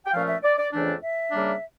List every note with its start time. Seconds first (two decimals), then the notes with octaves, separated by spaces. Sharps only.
0.06 G5
0.13 A#2 F3 A3 C#4 F5
0.28 E5
0.44 D5
0.58 D5
0.73 F2 C#3 E3 A3 D4
1.02 E5
1.32 C#3 G3 A#3 D4